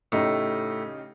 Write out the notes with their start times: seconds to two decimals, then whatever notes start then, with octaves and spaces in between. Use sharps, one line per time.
0.12 A2 C#3 D#4 G4